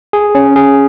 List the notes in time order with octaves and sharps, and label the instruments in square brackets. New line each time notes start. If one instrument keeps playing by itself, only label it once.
[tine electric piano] G#4
C#4
G#4